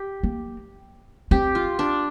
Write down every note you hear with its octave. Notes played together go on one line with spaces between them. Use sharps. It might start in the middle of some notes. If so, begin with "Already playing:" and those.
Already playing: G4
A#3
C4 G4
F4
D4